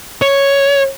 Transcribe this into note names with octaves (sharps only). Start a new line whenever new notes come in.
C#5